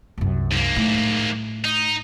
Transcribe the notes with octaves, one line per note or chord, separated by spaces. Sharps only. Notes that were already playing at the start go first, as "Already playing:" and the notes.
C2 F#2
G#2 A#3
A2
D#4